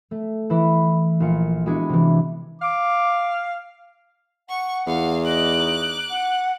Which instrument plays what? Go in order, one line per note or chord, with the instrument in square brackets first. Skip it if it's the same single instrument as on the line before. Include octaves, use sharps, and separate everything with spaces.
[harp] A3
E3 E4 B4
A#1 F4 C#7
G#3 B3 D4 E4 F#4 G#4
C3 E3
[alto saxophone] F5 [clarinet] D6
[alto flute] F#5 [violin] C#6
[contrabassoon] E2 [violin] F5
[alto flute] D#5 [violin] D6 F#6
[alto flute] D#4
F#5